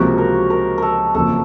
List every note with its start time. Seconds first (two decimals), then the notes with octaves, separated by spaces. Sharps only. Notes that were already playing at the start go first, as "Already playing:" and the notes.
Already playing: C#2 C3 F3 A#3 F#4
0.18 A#4
0.50 A#4
0.78 A4 A#4
1.14 F#1 F2 C#3 F3 A#3 A4